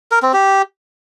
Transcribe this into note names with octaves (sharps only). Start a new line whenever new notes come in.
A#4
C4
G4